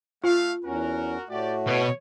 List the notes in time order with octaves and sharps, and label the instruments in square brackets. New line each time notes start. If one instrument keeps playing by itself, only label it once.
[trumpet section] A3 F5 [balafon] F4
[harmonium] E2 C#4 [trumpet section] F#4 A#4
[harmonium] A2 A3 F#4 [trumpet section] G4 D5
[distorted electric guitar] B2 [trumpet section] C#5